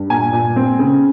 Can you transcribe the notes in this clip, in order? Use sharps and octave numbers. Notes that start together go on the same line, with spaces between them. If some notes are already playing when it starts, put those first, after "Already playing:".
Already playing: G2
A#2 G#5
A#2
C4
C#3